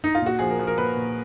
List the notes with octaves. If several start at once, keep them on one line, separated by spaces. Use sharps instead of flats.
D#4
F4
A#2 F#4
F3 G#4
A#4
F3
A#4
A#2 B4
A#2